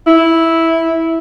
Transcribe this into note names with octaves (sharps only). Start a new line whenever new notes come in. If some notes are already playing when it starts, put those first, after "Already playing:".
E4